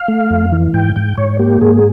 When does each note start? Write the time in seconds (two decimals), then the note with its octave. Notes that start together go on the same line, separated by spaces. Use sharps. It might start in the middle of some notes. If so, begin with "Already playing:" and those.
Already playing: F5
0.08 A3
0.31 F2
0.52 E3
0.74 G#2 G5
0.96 G#2 G5
1.18 G#2 C#5
1.39 A#3 G4
1.61 G#2 G#4